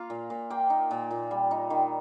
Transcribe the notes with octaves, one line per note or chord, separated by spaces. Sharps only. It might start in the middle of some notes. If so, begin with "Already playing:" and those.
Already playing: A#3 F4 F5
A#2
A#2
A#3 G5
D#4
A#2
A#2
G3
D#4
D#3